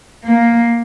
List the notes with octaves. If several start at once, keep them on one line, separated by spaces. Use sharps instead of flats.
A#3